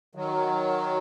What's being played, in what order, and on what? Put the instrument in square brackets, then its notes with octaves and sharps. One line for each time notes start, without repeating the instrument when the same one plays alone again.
[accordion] D#3 F#3